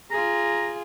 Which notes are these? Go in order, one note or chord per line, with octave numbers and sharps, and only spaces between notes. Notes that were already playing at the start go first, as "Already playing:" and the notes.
F4 G#4 A#5